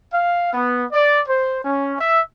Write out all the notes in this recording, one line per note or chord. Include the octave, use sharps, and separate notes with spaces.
F5
B3
D5
C5
C#4
E5